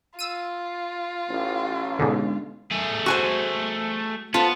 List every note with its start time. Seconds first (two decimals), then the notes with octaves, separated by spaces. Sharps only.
0.19 F4 E6 D#7
1.28 A1
1.99 G#2 B2 D3
2.72 A3 G#4
3.06 F#4 C5 G#5 C#6
4.34 B3 F4 A4 C5